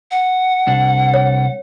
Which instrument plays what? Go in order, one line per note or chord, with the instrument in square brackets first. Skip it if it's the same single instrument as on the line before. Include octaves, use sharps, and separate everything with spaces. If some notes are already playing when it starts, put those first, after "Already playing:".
[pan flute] F#5
[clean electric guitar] C2 D4
[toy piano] C#5